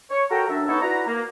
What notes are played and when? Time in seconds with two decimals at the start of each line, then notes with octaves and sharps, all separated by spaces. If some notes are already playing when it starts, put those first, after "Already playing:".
0.10 C#5
0.31 F#4 A4 A#4 G5 A#5
0.49 F#2 D4 E5
0.68 B3 D#4 A4 C#5
0.82 E4 F#4 B4 D5 A#5
1.07 A#3